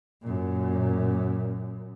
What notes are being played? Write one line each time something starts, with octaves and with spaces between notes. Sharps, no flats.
F#2 A#2